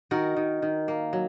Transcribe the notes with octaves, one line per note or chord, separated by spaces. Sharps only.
D#3 F#4 A#4
D#3
D#3
A#3
F#3